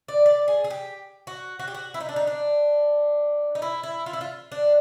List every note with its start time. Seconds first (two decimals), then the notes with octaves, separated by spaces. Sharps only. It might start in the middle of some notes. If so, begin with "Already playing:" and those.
0.08 D5
0.26 D5
0.48 G#4
0.64 G#4
0.70 G4
1.27 F#4
1.59 F#4
1.67 G4
1.74 F#4
1.94 E4
2.00 D#4
2.09 D4
2.16 D#4
2.27 D4
3.55 D#4
3.62 E4
3.83 E4
4.06 F4
4.13 E4
4.21 F4
4.52 D4